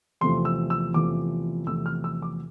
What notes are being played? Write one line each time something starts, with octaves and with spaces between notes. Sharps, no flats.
E2 C3 F3 A3 C6
E6
E6
E2 C3 F3 A3 D6
E2 C3 F3 A3 E6
F6
E6
D6